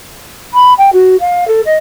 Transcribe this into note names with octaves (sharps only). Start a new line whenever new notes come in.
B5
G5
F#4
F5
A4
D#5